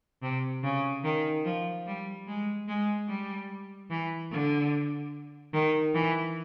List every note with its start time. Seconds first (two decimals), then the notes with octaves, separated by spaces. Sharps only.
0.23 C3
0.64 C#3
1.04 D#3
1.45 F3
1.86 G3
2.28 G#3
2.68 G#3
3.08 G3
3.90 E3
4.32 D3
5.53 D#3
5.94 E3